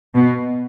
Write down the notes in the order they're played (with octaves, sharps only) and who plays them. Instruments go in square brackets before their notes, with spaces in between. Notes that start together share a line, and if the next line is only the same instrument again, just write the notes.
[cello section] B2